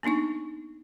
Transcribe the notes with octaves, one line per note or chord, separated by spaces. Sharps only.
A#3 B3 D4 D#4 C#6